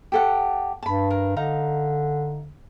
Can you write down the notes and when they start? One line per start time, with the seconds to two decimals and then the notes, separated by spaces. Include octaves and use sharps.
0.12 G4 A4 F#5
0.83 G2 A5 B5
1.10 A#4
1.36 D3 D#4 F5 A#5